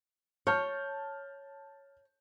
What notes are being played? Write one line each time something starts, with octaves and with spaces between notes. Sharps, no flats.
C#5 A5 F6 G6